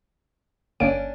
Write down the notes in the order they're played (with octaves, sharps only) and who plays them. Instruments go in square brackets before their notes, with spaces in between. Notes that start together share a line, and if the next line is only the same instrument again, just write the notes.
[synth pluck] G1 A#3 D7 [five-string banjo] C#4 D4